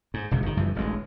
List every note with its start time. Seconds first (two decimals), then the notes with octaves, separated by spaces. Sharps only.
0.14 G#2
0.31 E1 C#2 C3
0.43 G1 D3 D#3
0.57 F#1 G2 E3 F3
0.75 D1 A1 D2 G#3